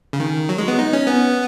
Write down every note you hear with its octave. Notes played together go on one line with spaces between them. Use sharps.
C#3
D#3
F#3
G#3
B3
D#4
C#4
B3